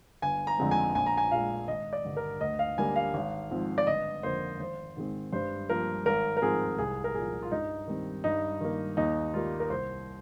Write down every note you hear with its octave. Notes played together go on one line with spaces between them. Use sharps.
G1 G#5
A#5
F2 D3 G#3 C4
G#5
A#1 G#5
A#5
G#5
A#2 G#3 F5
G#1 D#5
D5
G2 D3
A#4
D2 D#5
F5
D3 G3 A#3 G#5
F5
G#1
G#2 F3 C4
D5
G1 D#5
F2 D3 F3 A#3 C5
G#1 C5
G#2 D#3 G#3 C4
G2 C5
F3 A#3 A#4
G#1 A#4
A#4
G#2 F3 C4 G#4
C2 G#4
A#4
A#2 F3 G#4
F4
G2 D#4
D#3 G3 C4
G2 D#4
D#3 A#3
D#2 D#4
D#3 G3 A#3 F4
A#4
C2 C5